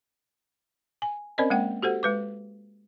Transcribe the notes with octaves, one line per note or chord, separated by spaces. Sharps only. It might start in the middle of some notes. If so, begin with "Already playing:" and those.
G#5
C4 C#4 A#4 C5 D5 D#5
G#3 A#3 F#5 G5
F#4 G4 A4 C5 F#5
G#3 B4 D6